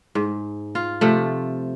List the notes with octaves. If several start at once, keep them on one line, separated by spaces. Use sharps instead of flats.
G#2
F4
C3 F3 A3